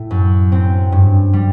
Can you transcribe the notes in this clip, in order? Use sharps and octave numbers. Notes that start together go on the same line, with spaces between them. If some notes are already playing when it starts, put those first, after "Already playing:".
Already playing: A2 A3
F#2
C4
G2
G3